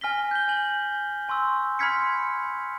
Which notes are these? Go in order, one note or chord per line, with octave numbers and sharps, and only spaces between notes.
G#5 F6 A#6 B6 G7
G6 G7
G#5 F#7
G#5 C6 C#6 E6
B5 C6 F6 G#6 B6 C#7